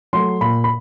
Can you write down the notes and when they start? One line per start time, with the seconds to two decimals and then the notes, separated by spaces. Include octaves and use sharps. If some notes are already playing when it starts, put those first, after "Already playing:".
0.13 F#3 A3 C6
0.41 A#2 B5
0.64 B5